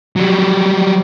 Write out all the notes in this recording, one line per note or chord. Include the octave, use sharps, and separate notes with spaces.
F#3 G3